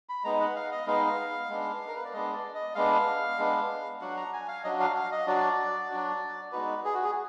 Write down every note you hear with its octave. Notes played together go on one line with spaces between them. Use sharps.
B5
G#3 B3 D#4 A#5
F#5
F5
D#5
G#3 B3 D#4 F5
G#3 B3 D4
A#4
B4
D5
G#3 B3 D4 D#5
D5
D#5
G#3 B3 D4 F5
G#3 B3 D4
F#3 D4 F#4 F#5
A#5
G#5
F5
F#3 D4 F#4 D#5
F5
F5
D#5
F#3 D4 F#4 D5
F#3 D4 F#4
G#3 B3 D#4 F#4 B4
G#4
F#4
G#4